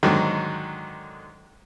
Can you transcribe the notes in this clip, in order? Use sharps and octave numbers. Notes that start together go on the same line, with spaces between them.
G#2 D3 D#3 F#3